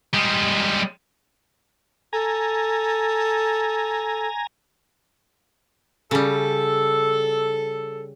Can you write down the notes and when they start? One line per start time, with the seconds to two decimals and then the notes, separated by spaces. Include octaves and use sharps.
0.14 G3 G#3
2.13 A4 G#5 A#5
6.11 C#3 G3 A4